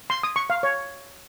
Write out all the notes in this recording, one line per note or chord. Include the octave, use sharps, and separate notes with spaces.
C6
D#6
C#6
F5
C#5